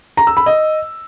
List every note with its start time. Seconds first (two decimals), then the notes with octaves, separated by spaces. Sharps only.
0.17 A#5
0.27 E6
0.37 B5
0.46 D#5